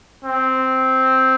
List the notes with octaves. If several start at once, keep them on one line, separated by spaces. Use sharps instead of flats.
C4